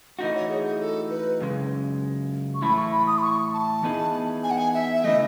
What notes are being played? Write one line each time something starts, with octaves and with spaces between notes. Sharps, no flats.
E3 A3 D#4 F#4 D#5
C#5
G#4
G#4
A4
B4
F#2 C#3 G#3
C#6
A2 E3 A3 E4 B5
C#6
B5
D#6
B5
C#6
A5
E3 B3 D#4 G#4
G#5
F#5
G#5
E5
E5
C#3 E3 A3 D#5